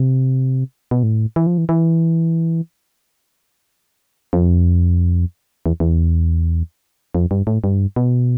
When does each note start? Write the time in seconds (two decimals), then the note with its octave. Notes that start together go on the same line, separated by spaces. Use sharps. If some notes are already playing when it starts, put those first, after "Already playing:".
Already playing: C3
0.91 B2
1.03 A2
1.36 E3
1.47 F3
1.58 E3
1.69 E3
4.33 F2
5.66 E2
5.80 E2
7.15 F2
7.31 G2
7.47 A2
7.64 G2
7.96 B2